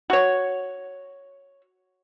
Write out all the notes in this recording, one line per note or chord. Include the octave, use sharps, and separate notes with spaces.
F#4 C#5